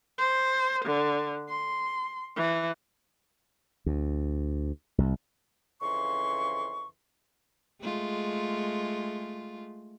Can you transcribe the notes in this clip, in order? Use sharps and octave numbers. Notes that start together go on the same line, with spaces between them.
C5
D3
C6
E3
D2
C2
F2 C#3 E3 C6 C#6
G#3 A3 F4